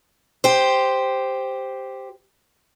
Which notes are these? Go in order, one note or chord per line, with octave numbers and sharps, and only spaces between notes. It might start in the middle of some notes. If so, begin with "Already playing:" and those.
G4 C5